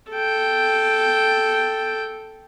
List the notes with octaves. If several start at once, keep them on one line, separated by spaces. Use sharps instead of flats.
A4 G5